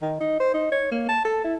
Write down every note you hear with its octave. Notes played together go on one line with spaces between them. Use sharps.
D#3
D#4
C5
D#4
C#5
A#3
A5
A4
E4